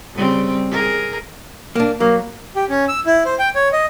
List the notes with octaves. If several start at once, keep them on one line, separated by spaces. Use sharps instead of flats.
C#3 G3 C4
G#4 A#4
A#3 D4
F#3 A#3
G4
C#4
E6
E4
C5
G5
C#5
D#5